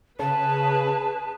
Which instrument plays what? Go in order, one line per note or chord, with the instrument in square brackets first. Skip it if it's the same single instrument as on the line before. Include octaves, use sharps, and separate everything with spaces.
[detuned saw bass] C#3 [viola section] G#4 B4 [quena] A5